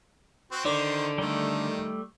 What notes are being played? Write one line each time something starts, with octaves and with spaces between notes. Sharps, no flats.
C4 F#4
D3 D#3 C5 D5
D#3 G3 A3